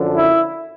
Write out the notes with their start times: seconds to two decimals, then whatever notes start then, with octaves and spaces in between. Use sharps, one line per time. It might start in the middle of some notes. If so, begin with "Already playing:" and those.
Already playing: F#2 D3 F3
0.14 E4